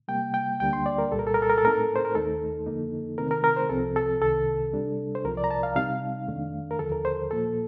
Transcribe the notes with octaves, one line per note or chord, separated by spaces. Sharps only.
C3 G3 A#3 G5
G5
D2 D3 G3 A#3 D4 G5
C6
D5
A#4
C2 A#2 G3 A4
A#4
A4
A#4
A4
A#4
A4
A2 A3 C4 D#4 A#4
A4
C5
A#4
D#2 D#3 A3 D#4 A4
F2 D3 F3 A#3 D#4
C3 D#3 A3 C4 D#4 A#4
A#4
A#4
C5
C2 C3 F3 C4 A4
A4
C2 C3 D#3 A4
C3 G3 D4
C5
C2 C3 F3 A#4
D5
A#5
A5
F5
C3 G3 C4 D#4 F5
F2 D#3 A3 D4
A#4
D#2 D3 F3 A4
A#4
C5
A#2 F3 A#3 A4